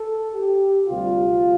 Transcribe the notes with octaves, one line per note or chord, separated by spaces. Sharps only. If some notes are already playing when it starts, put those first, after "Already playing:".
Already playing: A4
G4
D2 C3 G3 F4